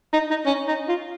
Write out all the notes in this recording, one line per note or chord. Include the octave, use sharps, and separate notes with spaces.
D#4
D#4
C#4
D#4
F4